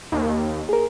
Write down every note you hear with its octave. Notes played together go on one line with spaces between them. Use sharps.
D#2
G#4 A#4